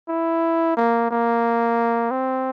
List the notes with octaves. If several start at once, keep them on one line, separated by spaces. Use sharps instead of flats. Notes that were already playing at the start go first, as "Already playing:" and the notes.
E4
A#3
A#3
C4